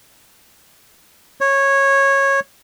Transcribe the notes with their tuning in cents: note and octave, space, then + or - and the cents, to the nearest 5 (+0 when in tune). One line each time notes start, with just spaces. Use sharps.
C#5 -15